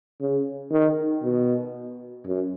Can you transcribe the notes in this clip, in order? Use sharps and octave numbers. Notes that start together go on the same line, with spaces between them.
C#3
D#3
B2
F#2